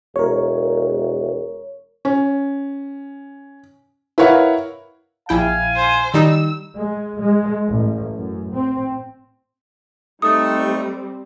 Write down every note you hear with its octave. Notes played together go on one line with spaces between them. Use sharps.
E1 A#4 C#5
C#4
E4 A#4 B4 C#5 F5 F#5
A#1 E4 F5 G5 G#5
C5
D#3 G3 D#4 E6
G#3
G#3
A1
F#2
C4
G3 A3 C4 D#4 D#6